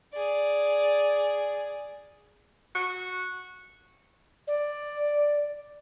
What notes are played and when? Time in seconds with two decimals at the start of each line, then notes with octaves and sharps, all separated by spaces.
0.12 G#4 D5
2.75 F#4
4.47 D5